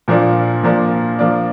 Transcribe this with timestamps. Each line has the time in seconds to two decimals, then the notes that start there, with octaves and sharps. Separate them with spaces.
0.08 A#2 F3 A#3 D4
0.63 A#2 F3 A#3 D4
1.19 F3 A#3 D4